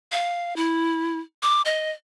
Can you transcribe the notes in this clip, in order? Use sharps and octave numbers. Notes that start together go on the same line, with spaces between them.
F5
E4
D6
D#5